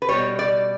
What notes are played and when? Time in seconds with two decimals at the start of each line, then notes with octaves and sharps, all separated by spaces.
0.02 B4
0.09 B2 G3 C#5
0.39 D5